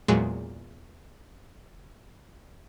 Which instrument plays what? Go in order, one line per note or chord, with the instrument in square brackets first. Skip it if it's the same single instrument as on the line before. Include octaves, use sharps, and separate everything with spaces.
[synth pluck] E2 A#2 F#3 G#3